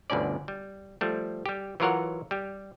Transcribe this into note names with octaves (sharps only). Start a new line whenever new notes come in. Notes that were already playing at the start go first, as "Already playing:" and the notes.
G1 D2 B2 C#4 D5
G3
F3 G3 A3
G3 G4
E3 F#3 F4 A#4 C#5 F#5
G3 G4